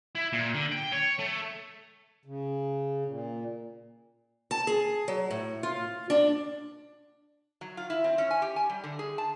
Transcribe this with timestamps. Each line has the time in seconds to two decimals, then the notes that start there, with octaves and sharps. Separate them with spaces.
0.15 E4
0.33 A#2
0.54 D3
0.72 G5
0.93 C#5
1.19 A3
2.25 C#3
3.06 A#2
4.51 A5
4.67 G#4
5.08 F#3
5.31 A2
5.63 F4
6.10 D4
7.61 F#3
7.77 F4
7.90 E4
8.04 C4
8.18 C#4
8.31 G#5
8.42 G4
8.56 G#5
8.70 G3
8.84 D3
8.99 G#4
9.18 A5